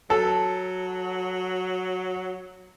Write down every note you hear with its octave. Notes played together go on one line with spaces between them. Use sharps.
F#3 A4